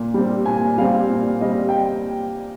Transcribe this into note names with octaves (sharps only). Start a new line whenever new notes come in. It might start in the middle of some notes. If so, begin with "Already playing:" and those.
Already playing: A#2
G3 C4
A#2 G#5
G3 C4 F5
A#2
G3 C4 D#5
G5